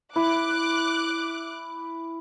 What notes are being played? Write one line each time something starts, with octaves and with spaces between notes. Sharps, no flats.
E4 D6 F#6